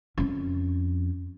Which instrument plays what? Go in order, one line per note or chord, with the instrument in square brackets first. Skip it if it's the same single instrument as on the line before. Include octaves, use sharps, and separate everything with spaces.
[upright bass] F2 C#4